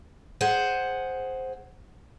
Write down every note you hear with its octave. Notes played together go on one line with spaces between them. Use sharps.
G#4 C5 F#5